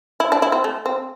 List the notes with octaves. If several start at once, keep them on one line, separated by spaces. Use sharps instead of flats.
E4
D4
E4
C4
A3
C4